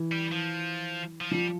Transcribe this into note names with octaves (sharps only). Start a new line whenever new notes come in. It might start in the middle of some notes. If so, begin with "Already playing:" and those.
Already playing: E3
G3
F3
F3
F3 G3